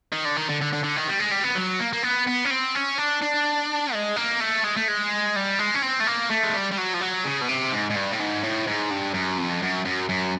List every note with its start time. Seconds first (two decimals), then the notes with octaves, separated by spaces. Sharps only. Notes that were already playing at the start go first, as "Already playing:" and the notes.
0.13 D#3
0.25 D3
0.37 D#3
0.49 D3
0.61 D3
0.73 D3
0.84 D3
0.96 D#3
1.08 G3
1.20 G#3
1.32 G3
1.44 B3
1.55 F#3
1.80 A#3
1.93 A#3
2.03 B3
2.27 B3
2.45 C#4
2.50 C4
2.75 C#4
2.98 D4
3.22 D4
3.93 G#3
4.16 A#3
4.41 A3
4.64 G#3
4.77 A3
4.88 G#3
5.36 G3
5.59 G#3
5.74 C#4
5.82 C4
6.00 A3
6.07 A#3
6.31 A3
6.44 G#3
6.54 G3
6.72 G3
6.78 F#3
6.94 F3
7.01 F#3
7.25 C#3
7.42 B2
7.49 C3
7.73 G#2
7.91 G#2
7.96 G2
8.13 A2
8.20 G#2
8.43 A2
8.67 G#2
8.91 G2
9.14 F#2
9.38 F2
9.63 F#2
9.85 F#2
10.09 F#2